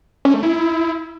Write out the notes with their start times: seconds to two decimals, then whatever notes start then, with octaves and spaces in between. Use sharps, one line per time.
0.25 C#4
0.34 A3
0.43 E4